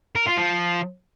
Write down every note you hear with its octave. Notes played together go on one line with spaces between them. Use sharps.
A#4
F4
F3